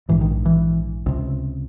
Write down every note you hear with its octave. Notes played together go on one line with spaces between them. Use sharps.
A#1 G#2 E3
D#3
E3
C#2 C3